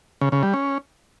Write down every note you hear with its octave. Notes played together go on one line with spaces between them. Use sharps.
C#3
C#3
G3
C#4